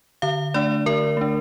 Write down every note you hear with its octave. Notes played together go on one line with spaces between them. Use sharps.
D3 F5
A3 D4 D5
D3 A#4
A3 D4